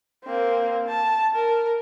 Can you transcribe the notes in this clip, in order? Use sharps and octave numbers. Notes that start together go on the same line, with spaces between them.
A#3 C4
A5
A#4